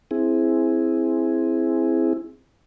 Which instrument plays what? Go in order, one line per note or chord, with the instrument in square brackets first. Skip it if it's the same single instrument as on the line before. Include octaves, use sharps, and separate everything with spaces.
[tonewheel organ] C4 E4 G#4